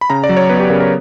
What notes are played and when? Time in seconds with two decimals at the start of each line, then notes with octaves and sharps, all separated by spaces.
0.01 B5
0.10 C#3 A#5
0.24 D5
0.29 F#3
0.37 C#5
0.49 B3 B4
0.60 G4
0.70 C#3 A#4
0.80 A#4